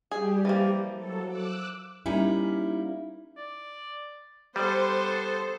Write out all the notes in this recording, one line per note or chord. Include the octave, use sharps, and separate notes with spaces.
G3 G4 G#4
E3 F3 A#3
F#3 A4
D6 E6 F#6
G3 A#3 C#4 D#4 E4
D5
G3 B3 A4 C5